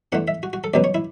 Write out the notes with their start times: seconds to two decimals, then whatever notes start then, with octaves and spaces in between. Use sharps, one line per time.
0.12 E2 D3 A3 F#5
0.28 E5
0.43 F#4
0.53 F#4
0.64 A4
0.74 C#2 B2 F#3 B3 D5
0.84 C#5
0.95 E4